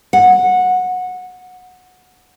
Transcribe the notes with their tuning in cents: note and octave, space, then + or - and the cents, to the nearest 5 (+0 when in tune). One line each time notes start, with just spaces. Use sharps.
F#5 -15